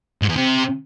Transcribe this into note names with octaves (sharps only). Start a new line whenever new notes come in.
G#2
E2
C3